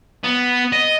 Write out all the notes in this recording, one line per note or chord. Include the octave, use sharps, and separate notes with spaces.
B3
D#5